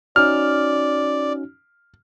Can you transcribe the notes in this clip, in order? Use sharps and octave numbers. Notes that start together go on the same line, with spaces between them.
C#4 D#4 F#4 D5 F6